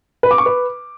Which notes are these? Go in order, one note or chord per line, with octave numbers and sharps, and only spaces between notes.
B4
D6
C#6
B4